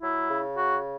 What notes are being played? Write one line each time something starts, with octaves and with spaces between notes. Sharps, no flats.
F#3 E4
C#3
F#4